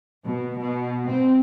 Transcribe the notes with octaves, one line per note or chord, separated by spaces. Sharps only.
B2
B2
C4